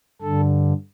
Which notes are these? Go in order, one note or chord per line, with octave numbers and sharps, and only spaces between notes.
G2 D3 A4